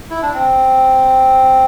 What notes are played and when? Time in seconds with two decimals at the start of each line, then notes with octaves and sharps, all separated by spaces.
0.10 E4
0.22 D4
0.34 C4